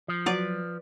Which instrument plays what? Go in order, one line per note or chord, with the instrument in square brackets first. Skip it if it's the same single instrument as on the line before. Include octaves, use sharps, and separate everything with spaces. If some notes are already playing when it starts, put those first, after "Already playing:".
[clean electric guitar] F3
[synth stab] F#3 [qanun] B4 D5